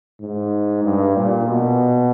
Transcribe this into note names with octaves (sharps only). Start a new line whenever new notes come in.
G#2
G2
A#2
B2